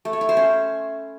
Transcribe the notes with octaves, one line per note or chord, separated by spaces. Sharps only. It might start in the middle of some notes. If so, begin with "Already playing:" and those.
A3
C#5
E4
C5
C#4